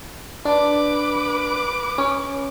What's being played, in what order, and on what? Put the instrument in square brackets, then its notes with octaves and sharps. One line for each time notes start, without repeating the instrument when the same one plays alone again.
[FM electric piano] D4 [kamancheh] B4 D6
[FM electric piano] C#4